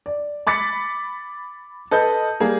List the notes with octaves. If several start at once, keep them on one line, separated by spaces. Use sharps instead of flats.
D5
B5 D6 A6 B6 C#7
A4 B4 D#5 G6
G3 A#3 G#4